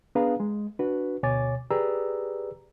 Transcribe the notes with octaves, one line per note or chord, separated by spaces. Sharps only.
B3 D4 G#4 B4 F5 A#5
G#3
D4 F#4 B4
D2 B2 C#5 G#5 D6 A6
G4 G#4 B4 D5 A#5 E6